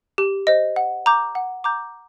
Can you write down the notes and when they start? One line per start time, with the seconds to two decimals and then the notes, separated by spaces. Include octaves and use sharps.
0.18 G4
0.47 C5 D#5
0.76 F#5
1.06 A#5 D6 G6
1.35 F#5
1.64 A#5 D6 G6